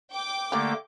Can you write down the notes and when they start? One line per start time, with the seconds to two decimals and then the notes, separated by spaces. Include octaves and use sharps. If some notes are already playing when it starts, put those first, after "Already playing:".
0.12 G5 D6
0.52 D3 A3 A#3 G4 D5